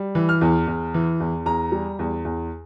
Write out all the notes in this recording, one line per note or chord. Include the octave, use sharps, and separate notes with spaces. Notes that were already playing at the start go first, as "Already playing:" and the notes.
Already playing: G3
E3
F6
E2
E2
E3
E2
E2 A#5
G3
E2
E2